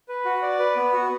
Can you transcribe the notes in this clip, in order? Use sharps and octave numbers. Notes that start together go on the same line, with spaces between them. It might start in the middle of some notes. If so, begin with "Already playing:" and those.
B4
F#4
D5
B4
B3
F#4